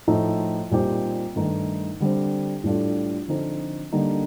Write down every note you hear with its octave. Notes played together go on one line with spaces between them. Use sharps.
A2 F3 A3 D#4
A#2 G3 C4 D#4 G4
G2 D#3 A3 D#4
D3 G3 C4
A2 G3 D4 F4 A4
D3 F3 C4 D#4 A4
D3 G3 A#3 D#4